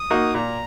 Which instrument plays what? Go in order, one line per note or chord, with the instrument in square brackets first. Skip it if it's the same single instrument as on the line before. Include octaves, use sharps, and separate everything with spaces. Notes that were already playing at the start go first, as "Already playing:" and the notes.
Already playing: [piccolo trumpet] D#6
[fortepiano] A#3 D#4 F#4
[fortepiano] A#2 [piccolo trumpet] A#5